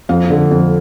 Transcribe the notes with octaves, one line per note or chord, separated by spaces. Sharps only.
F2 F5
D3
F2